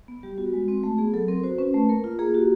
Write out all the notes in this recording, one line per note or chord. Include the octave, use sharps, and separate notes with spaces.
B3
G3 G4
B3 F#4
G#3
C4
A3
B3 G#4
F#3 A4
C4 A#4
F#4 C5
C#4 B4
A3
A#3 A#4
F4
A#3 G#4
F#4 G4